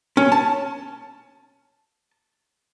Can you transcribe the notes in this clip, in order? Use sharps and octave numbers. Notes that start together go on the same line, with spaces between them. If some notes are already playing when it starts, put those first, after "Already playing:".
C#4
A5